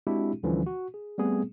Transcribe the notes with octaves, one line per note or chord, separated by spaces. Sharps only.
G#3 C4 D4 E4 F#4 G4
D2 D3 E3 F3 G3 C#4
F#4
G#4
G3 A3 B3 C4 G#4